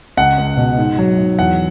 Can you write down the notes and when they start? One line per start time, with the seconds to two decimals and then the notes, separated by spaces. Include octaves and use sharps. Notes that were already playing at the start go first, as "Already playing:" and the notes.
0.17 C#2 F#5
0.38 C#2
0.57 B2
0.78 G#2
0.98 F#3
1.18 G#2
1.38 E2 F#5